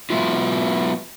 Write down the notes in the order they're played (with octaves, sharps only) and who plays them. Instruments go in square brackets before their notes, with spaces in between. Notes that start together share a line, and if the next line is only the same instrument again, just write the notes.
[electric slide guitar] F#3 G#3 B3 E4 F4